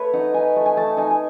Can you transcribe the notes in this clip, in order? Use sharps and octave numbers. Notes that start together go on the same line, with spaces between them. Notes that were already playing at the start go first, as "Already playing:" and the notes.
Already playing: A3 B4 C#5
D#4 F#5
D#4 G#5
A3
G#5
A3 A5
D#4 G#5
G#5